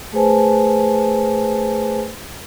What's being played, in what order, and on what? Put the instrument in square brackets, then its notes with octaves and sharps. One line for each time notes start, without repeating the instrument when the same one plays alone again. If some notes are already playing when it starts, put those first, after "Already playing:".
[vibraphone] A3 G#4 B4 C5 G#5 A5